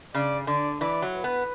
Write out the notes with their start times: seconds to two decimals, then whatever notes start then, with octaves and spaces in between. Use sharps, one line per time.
0.15 C#3 D5
0.47 D3 D5
0.81 E3 D5
1.02 F#3
1.14 B4
1.24 B3